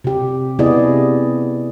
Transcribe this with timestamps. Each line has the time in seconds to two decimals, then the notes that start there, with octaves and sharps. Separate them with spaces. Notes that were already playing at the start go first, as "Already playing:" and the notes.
0.04 C3 G4
0.59 C3 B3 E4 G#4 D5 D#5